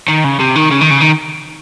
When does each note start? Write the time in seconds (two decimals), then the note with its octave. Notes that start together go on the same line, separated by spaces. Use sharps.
0.08 D#3
0.24 C#3
0.40 C3
0.56 D#3
0.71 C#3
0.81 D#3
0.90 C#3
1.00 D#3